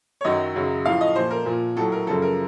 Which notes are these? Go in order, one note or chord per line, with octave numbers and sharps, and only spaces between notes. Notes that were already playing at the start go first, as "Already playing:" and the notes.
C#5
F#2 D#3 F#3 D#5
F#2 C#3 F#3
A2 F3 F5
D#5
A#2 F3 C5
A#4
A#2 F3
A2 F#3 A4
A#4
F#2 C#3 F3 A4
A#4